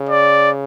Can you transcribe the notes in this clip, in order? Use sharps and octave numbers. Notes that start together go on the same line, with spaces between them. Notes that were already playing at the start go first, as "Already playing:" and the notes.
Already playing: C#3
D5